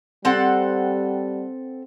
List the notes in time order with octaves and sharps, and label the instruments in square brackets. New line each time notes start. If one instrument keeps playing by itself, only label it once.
[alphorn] G3 [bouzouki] C4 A4 F#5